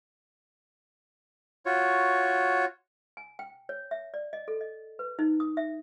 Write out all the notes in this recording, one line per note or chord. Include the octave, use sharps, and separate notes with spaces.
F4 F#4 C#5
G#5
G5
C#5
E5
D5
D#5
A4
D#5
B4
D#4
D#6
E5